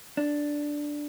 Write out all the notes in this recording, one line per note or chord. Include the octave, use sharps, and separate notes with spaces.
D4